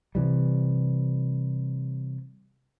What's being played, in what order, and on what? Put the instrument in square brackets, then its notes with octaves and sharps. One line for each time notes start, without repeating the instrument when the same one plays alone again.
[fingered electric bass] C3 E3 G3